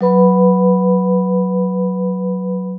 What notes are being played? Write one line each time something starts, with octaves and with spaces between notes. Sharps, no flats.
F#3 B4 B5